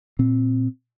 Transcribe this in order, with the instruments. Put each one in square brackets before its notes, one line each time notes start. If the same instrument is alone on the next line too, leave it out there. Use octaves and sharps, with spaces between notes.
[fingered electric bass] A#2 C4